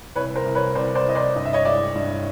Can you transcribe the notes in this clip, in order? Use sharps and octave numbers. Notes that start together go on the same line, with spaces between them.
C2 B4 C#5
A#4 C5
C2
B4 C#5
C2 C5 D5
C5 D5
C2 D#5
C5 D5
G2 D#5
E5
C#5 D#5
G#3 D5 E5
G2